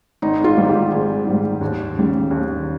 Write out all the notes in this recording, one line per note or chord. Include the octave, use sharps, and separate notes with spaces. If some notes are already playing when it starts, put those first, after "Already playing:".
G#1 D#4
F4
G#2 G3
G4
G#1 G#4
G#2 G3
D#2
C#3 G3
D#2